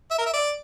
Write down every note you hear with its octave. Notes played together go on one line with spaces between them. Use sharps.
E5
A#4
E5
D5